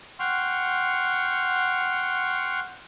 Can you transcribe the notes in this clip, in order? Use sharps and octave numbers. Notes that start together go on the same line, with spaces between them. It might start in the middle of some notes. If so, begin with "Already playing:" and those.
F#5 G5 C6 C#6 F6